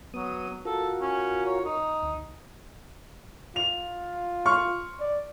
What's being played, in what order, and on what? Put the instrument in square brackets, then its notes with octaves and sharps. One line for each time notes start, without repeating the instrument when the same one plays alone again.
[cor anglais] F#3 [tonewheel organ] B3 D#6
[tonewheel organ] F4 F#4 A#4 [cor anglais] A4
[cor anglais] C#4
C#5
D#4
[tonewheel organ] D2
[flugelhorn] F4 [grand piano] F7
[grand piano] C6 C#6 F6
[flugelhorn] D5